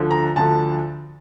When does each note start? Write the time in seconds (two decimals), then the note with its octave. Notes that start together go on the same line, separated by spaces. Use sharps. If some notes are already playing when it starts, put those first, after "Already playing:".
Already playing: D2 D3 F3
0.11 A#5
0.36 D2 D3 F3 A5